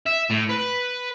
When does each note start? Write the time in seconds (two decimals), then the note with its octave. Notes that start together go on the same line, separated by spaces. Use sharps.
0.06 E5
0.31 A2
0.50 B4